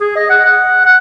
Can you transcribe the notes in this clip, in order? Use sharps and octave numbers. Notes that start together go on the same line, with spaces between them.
G#4
D#5
F#5
F#5
F#5